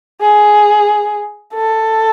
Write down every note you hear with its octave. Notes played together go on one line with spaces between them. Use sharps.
G#4
A4